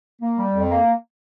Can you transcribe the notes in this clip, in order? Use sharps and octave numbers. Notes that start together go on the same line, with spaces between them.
A#3
G3
F2
A#3